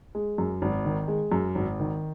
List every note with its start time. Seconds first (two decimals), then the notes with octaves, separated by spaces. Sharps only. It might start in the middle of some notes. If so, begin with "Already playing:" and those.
0.15 G#3
0.38 F#2
0.62 G#1
0.85 D#3
1.08 G#3
1.32 F#2
1.55 G#1
1.80 D#3